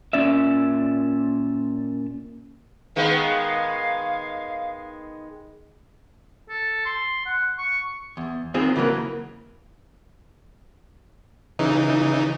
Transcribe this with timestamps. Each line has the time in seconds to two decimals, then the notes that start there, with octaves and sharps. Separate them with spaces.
0.13 A#2 C#4 D5 E5
2.96 D#3 G#3 B3 F5
6.49 A4
6.86 C6
7.26 F#5
7.58 C#6
8.17 E2
8.54 D#3 C4 F4 G#4
8.76 C#3 E3 F#3 A3 A#3
11.59 C#3 E3 D#4